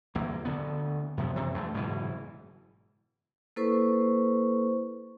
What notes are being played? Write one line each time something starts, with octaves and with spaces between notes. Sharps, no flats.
G1 E2 A#3
D2 D3 B3
F#2 C3 F3 B3
F#2 C3 E3 G#3
E2 G2 G#3 A3
F#1 G#2 B2 E3
A#3 E4 A4 B4 C5 C#6